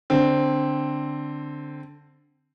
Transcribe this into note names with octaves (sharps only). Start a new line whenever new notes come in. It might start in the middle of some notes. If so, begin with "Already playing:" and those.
D3 C4